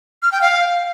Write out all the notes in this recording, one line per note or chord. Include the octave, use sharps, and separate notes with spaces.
F6
G5
F5